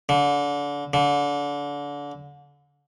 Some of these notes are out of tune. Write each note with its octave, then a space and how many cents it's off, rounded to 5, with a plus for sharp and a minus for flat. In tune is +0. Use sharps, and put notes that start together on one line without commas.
D3 -30
D3 -30